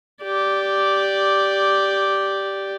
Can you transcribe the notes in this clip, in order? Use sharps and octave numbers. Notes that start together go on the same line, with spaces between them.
G4 D5